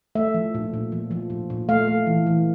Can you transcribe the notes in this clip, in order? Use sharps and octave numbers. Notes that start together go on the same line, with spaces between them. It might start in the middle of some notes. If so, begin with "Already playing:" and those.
A3 E5
F3
A#2
A#2
F3
F3
A#2
A#2
A3 F5
A3
E3
E3